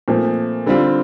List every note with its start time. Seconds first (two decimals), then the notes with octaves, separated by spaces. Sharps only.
0.08 A#2 F3 A3 C4
0.66 D3 G3 C4 F4